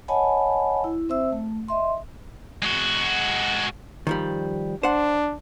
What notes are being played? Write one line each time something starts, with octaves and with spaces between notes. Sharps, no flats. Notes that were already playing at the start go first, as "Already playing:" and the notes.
C#5 D#5 F#5 G#5 A5 B5
E4
C4 C5 E5 E6
A3
D#5 E5 C6
G#3 F#4
D#3 F3 G3
D4 C5 F#5